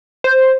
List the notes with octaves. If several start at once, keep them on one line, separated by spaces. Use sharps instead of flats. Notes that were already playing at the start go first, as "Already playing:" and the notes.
C5